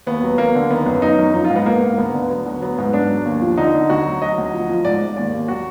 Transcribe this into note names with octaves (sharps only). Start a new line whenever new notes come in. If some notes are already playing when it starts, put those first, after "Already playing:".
D#2 B3
F#3
D#2 A#3
D3
D#3 B3
F#2
F#3 D#4
F#2
F3 D#4
F4
G#2
B3
G#2 A#3
G#2
D2 B3
D3
F#3 B3
D2
F#3 B3
G#2
G#2 D4
F#3
D#2
F3
D3 D#4
D3
D2 F#4
F#3
F#3 D#5
D2
F3
F3
G#2 D5
G#2
D#2 D5
D#2
F#3 F#4